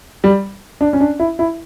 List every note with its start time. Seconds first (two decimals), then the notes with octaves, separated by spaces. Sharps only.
0.24 G3
0.81 D4
0.93 C#4
1.01 D4
1.20 E4
1.39 E4